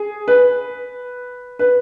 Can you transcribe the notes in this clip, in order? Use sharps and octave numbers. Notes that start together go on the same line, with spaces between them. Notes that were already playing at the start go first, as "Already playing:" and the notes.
Already playing: G#4
B4
B4